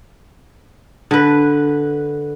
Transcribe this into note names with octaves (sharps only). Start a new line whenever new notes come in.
D3 B4